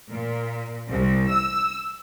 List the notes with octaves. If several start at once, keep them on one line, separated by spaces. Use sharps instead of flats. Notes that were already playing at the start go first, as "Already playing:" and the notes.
A#2
C2
E6